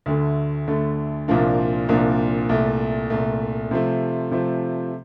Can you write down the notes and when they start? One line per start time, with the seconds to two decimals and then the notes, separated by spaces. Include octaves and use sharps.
0.06 D2 D3 A3
0.67 D2 D3 A3
1.28 C2 A#2 F3 A#3 D4
1.88 C2 A#2 F3 A#3 D4
2.49 C2 A#2 A3
3.10 C2 A#2 A3
3.71 C3 F3 A3
4.31 C3 F3 A3